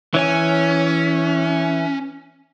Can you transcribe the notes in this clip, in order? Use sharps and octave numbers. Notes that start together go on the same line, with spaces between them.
E3 C#4 C#5 G#5